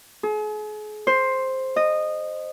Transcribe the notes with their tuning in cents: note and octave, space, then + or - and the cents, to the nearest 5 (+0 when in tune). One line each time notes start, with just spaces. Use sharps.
G#4 +40
C5 +5
D#5 -15